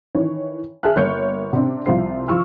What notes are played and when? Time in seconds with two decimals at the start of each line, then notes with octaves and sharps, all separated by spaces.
0.15 D#3 E3 C#5
0.83 G#4 E5 A5 F6 F#6
0.96 G1 A#3 C#5 G6 C#7
1.53 C3 C4 D4
1.86 C2 C3 F3 F4 C5 C7
2.28 F3 F4 C#6 E6 F6